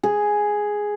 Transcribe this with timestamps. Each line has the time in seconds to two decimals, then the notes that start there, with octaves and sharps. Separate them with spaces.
0.03 G#4